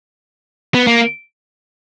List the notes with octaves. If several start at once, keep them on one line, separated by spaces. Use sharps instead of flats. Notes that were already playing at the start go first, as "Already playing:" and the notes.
B3
A#3